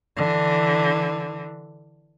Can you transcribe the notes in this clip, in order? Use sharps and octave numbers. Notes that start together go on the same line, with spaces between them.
D3 E3